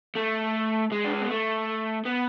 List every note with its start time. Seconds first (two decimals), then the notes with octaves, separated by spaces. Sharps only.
0.16 A3
0.92 G#3
1.04 D4
1.13 C#4
1.21 B3
1.30 A3
2.06 B3